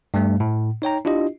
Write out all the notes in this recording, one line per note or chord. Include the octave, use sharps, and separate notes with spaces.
G2 G3 A3
A2
D#4 C#5 G5 A#5
D4 E4 F4 G4 D#5